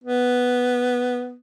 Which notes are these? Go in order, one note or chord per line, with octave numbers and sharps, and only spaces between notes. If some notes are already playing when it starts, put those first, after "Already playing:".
B3